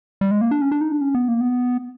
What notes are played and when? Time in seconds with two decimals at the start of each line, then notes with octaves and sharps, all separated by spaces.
0.21 G3
0.31 G#3
0.41 A#3
0.51 D4
0.61 C#4
0.72 D4
0.81 D#4
0.92 D4
1.01 C#4
1.15 B3
1.28 A#3
1.41 B3